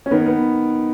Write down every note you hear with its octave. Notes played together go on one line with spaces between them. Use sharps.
C#4
D#3 B3
B3